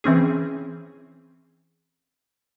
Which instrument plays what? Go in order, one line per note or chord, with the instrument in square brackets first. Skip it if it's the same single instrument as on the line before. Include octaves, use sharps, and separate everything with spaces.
[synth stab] E3 C4 C#4 G#4